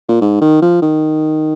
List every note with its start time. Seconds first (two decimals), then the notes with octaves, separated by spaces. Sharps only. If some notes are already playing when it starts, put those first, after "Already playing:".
0.09 A#2
0.21 G#2
0.41 D#3
0.62 F3
0.82 D#3